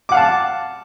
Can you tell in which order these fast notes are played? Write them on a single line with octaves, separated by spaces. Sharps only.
D6 F#5 F5 A5